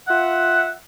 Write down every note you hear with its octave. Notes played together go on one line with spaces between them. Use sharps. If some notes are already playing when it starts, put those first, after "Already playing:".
F4 E5 F#5